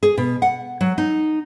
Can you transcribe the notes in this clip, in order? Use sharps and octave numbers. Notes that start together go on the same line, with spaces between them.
G#4
B2
F#5
F#3
D#4